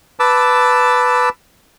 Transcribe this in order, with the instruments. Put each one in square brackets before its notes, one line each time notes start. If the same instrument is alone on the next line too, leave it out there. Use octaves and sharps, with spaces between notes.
[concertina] B4 A5 D6 E6